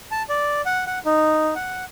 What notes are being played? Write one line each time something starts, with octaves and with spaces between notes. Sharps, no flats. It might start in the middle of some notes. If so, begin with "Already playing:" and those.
A5
D5
F#5
F#5
D#4
F#5